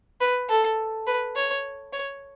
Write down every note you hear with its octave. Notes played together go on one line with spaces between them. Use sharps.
B4
A4
B4
C#5
C#5